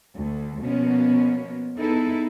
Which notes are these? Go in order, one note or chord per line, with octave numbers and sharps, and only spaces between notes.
D2
B2 F3 A#3 B3 C#4
B3 D#4 E4 G#4 A4